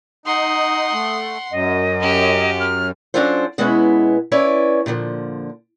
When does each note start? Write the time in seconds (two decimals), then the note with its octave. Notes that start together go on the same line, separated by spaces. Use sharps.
0.26 D#4 F#5 C6 D#6
0.93 A3
1.51 F#2 D#5
2.01 C#4 G4
2.60 F6
3.14 F#3 C#4 D4 F4 A4 C5
3.58 B2 G#3 B3 C#4 E4
4.32 C#4 E4 B4 C#5 D5
4.86 A#2 D3 D#3 F3